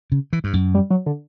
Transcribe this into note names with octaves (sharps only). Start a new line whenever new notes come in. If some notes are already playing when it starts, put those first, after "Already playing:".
C#3
E3
G2
F#2
G3
F#3
D3